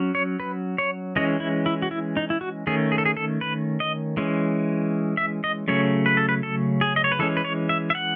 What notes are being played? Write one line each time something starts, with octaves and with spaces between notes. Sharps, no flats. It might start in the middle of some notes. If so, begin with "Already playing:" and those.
Already playing: F#3 C#4
C#5
B4
C#5
E3 G#3 C#4 D#5
E4
E4
F#4
E4
D#4
E4
F#4
D#3 A3 C#4 G#4
G#4
A4
G#4
A4
B4
D#5
E3 G#3 C#4
E5
D#5
C#3 F#3 A3 C#4 C#5
B4
A4
B4
A4
G#4
D#5
C#5
B4
E3 G#3 C#4 A4
B4
C#5
E5
E5
F#5